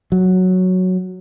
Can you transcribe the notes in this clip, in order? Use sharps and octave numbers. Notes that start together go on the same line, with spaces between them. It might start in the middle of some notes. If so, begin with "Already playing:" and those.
F#3